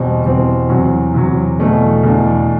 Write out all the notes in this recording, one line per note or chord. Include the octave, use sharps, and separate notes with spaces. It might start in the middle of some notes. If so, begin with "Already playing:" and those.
Already playing: E2 B2 G3 C4
E2 B2 G3 C4
E2 C3 F#3
E2 C3 F#3
E2 B2 A3 D4
E2 B2 A3 D4